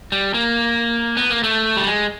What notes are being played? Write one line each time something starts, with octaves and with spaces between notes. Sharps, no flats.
G3
A#3
B3
A#3
A3
G3
G#3